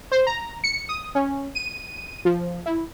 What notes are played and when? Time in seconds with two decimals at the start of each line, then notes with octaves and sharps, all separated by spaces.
0.12 C5
0.27 A#5
0.64 C#7
0.89 D#6
1.15 C#4
1.55 D#7
2.25 F3
2.66 E4